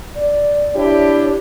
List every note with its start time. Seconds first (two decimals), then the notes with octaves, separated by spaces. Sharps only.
0.15 D5
0.75 D4 E4 G4 C#5